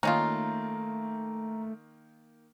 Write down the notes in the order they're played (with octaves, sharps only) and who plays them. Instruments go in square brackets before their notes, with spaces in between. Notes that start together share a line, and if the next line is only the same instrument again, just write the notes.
[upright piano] D#3 A#3 [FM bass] A3 [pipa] C#4 D#4 F4 [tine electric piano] A#5